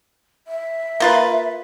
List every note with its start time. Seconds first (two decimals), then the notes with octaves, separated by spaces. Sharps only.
0.47 E5
1.00 A#3 F4 B4